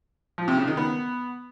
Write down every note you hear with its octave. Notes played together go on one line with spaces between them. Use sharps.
F3
C3
C#3
D#3
B3